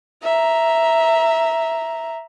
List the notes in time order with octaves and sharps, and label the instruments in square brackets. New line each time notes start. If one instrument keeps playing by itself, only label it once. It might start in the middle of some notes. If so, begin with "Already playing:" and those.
[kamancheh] E5 A#5